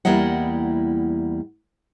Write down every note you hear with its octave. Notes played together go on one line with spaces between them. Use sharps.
E2 G3 A#3 E4 D#5 F#5